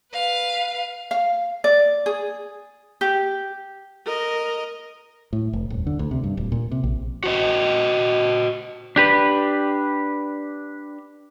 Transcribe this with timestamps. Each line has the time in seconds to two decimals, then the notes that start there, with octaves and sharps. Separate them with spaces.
0.13 B4 F5
1.11 F5
1.64 D5
2.06 G#4
3.01 G4
4.05 A#4 D#5
5.33 A2
5.53 F1
5.70 D#1
5.87 D3
5.99 D2
6.11 C3
6.24 G2
6.37 D1
6.52 A#2
6.71 C3
6.84 A#1
7.24 F#4 C5 D#5
8.96 D4 G4 B4